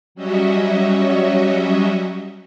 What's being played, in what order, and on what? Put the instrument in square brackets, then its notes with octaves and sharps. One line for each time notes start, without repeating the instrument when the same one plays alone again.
[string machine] F#3 G3 C#4 F#4 D#5 E5